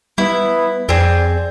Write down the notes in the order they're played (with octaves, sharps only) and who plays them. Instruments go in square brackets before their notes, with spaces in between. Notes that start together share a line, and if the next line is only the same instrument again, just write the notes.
[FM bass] G3 [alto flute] B3 [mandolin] E4
[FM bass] F2 [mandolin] C4 G#4 [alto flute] D5